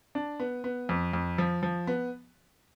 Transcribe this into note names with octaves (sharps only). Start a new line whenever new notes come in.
D4
B3
B3
F2
F2
F3
F3
B3